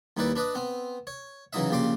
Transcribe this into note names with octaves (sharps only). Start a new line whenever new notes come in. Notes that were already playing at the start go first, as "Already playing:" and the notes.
D#2 G3 D#4 E4 B4 D5
D4 B4 D5 D#5
B3 C4
C#5
C#3 E3 F#3 D#4 D#5 E5
A#1 C#3 G4 D5 C6 D6